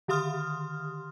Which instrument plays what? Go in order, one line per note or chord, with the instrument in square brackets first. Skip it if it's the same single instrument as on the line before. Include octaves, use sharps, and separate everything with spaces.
[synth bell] D3 D#3 G4 C6 D#6 F6